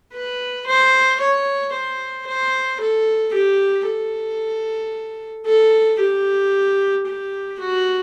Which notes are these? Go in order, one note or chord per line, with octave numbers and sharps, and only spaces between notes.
B4
C5
C#5
C5
C5
A4
G4
A4
A4
G4
G4
F#4